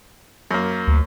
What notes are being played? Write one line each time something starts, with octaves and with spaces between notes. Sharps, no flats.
F#2 A#3
D2